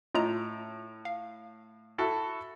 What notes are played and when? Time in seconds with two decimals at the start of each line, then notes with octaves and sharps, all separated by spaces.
0.15 A2 F4 D#5 A#5
1.05 F5
1.98 E4 F#4 A4